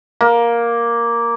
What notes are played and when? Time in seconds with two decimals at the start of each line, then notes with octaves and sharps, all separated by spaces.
0.21 A#3